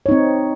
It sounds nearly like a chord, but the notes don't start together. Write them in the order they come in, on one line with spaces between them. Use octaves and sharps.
C#5 D#4 C4